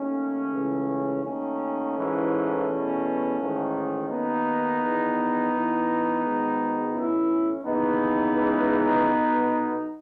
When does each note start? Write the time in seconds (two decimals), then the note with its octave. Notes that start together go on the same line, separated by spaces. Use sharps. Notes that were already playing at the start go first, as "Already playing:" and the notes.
Already playing: D#2 D#3 A3 C#4
0.52 C#2 C#3 E3
1.23 D#2 D#3 A3 C#4
1.95 A1 G#2 E3
2.66 E2 B2
3.37 A1 G#2 D#3
4.08 D#2 D#3 B3 D#4
4.79 E2 D#3
5.51 A1 A2 E3
6.22 G#1 G#2 D#3
6.93 B1 A2 E3 C#4 E4
7.64 D#2 C#3 E3 B3 D#4
8.35 C#2 C#3 E3
9.07 B1 B2